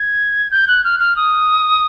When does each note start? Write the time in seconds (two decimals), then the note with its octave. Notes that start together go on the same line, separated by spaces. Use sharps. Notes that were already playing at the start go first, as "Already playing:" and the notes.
Already playing: G#6
0.51 G6
0.68 F#6
0.84 F6
1.00 F6
1.16 D#6